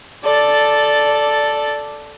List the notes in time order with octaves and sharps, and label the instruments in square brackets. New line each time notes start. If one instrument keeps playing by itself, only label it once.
[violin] A4 D5